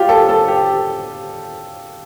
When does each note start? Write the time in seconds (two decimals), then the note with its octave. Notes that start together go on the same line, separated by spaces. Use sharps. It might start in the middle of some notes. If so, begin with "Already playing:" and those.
Already playing: F4 G4
0.09 A4
0.29 A4
0.48 G4